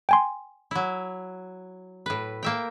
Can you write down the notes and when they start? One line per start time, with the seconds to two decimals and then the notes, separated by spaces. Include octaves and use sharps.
0.09 G5 G#5 C6
0.71 F#3 E4
2.06 A2 B4
2.43 A#3 E5 G5